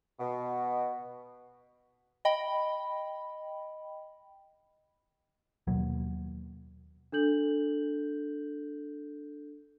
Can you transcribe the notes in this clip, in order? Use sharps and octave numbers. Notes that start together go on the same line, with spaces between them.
B2
D#5 G5 B5
D#2 B2 F#3 A#3
D4 A4 G6 F#7